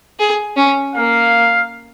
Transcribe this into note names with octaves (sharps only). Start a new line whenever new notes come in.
G#4
C#4
A#3 F5